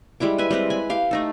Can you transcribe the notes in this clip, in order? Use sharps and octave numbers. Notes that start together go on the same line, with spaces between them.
G3 G#3 E4 D6
B4 E5 G#5
G3 G#3 C4 B4
G#5 B5
G4 F5
A3 D#4 A4